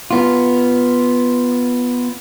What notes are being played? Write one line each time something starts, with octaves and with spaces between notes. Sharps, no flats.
B3 F4